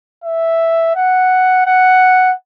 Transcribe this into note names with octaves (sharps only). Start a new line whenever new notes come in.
E5
F#5
F#5